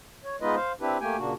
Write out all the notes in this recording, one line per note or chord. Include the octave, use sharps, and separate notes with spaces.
C#5
G#3 B3 D#4 F4 B4 D#5
C5 F5
C4 D4 E4 G4 B4
A3 A#3 G4 G5 G#5
A#2 C#3 A#3 D4 F#4